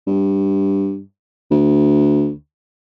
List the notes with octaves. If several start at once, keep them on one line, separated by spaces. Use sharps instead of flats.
G2
D2